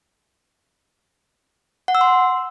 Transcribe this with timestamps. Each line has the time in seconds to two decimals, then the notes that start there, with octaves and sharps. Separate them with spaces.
1.88 F#5
1.95 E6
2.01 C6